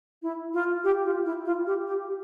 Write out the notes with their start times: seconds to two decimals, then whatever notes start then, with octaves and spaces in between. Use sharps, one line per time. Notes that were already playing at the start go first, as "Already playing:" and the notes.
0.22 E4
0.54 F4
0.84 G4
1.05 F4
1.25 E4
1.45 F4
1.67 G4
1.87 G4